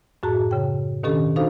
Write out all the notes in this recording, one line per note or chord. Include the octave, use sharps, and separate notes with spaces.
F#2 A2 F#4 G#4 A5 A#5
C#3 G5
B2 D#3 C#4 D4 G4 A4
D4 D#4 F#4 A4 C5 F5